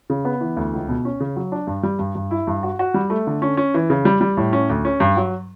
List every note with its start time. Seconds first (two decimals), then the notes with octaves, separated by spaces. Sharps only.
0.10 C#3
0.25 B3
0.41 E3
0.57 D2
0.73 C#2
0.89 B2
1.05 C#4
1.20 C#3
1.36 F#3
1.52 D4
1.67 G2
1.83 G3
1.99 G2
2.15 G2
2.31 E4
2.47 G2
2.63 F#4
2.79 F#4
2.94 G3
3.10 A3
3.27 D3
3.42 C#4
3.57 C#4
3.74 E3
3.90 C#3
4.05 G3
4.21 G3
4.37 A2
4.53 C#4
4.69 D2
4.85 C#4
5.00 G2
5.17 F#3